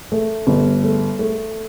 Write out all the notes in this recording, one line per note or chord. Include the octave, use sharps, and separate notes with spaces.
A3
G1
A3
A3